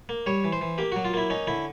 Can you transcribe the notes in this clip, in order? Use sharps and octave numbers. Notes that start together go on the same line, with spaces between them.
A#3
G3 C#5
E3
C5
E3
A#3 G4
F#3 F#4
F4
A#3 E4
C#4 D#4
D3 E4